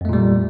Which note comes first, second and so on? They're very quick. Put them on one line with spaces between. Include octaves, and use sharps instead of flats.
F2 A3 A#2 G3